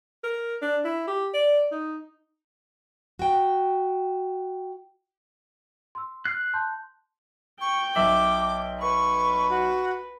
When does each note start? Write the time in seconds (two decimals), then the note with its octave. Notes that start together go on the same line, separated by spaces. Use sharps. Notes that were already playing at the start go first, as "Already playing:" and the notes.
0.24 A#4
0.62 D4
0.85 E4
1.07 G4
1.34 D5
1.72 D#4
3.19 F#4 G5
5.95 C6 E6
6.25 F6 F#6 C7
6.53 A5 C6 G6
7.61 G5 C#6
7.95 B1 E5 D6 F#7
8.81 B4 C#6
9.50 F#4